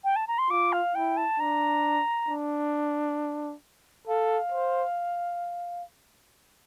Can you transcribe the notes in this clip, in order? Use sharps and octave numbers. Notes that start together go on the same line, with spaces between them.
G5
A5
A#5
C6
F4 D6
F5
E4 G5
A5
D4 A#5
D4
A4 F5
C5